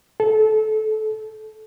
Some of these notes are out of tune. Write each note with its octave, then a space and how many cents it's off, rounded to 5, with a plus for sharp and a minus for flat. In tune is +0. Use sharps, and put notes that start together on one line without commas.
A4 -20